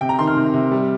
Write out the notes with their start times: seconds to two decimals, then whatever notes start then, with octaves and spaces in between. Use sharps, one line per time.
0.01 C3 G5
0.09 A#5
0.19 D#3 C6
0.27 F6
0.36 C3
0.54 C3
0.71 G3